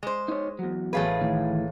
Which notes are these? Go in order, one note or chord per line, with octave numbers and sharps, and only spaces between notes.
G#3 C5
D#4 C#5
E2 F#3
A1 A3 G#4 B4 F5 G#6
A2 D#3 E3